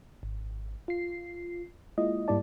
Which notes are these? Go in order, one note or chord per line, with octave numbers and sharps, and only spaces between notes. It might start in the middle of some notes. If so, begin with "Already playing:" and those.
G#1
F4 C7
G#3 A#3 E4 F4 D#5
G#2 G3 A#3 E4 D5 A5